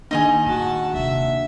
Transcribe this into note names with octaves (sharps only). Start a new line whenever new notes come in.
D#3 A#3 D4 D#4 D#5 G#5
A#2 F#4 A5
D#1 C3 E5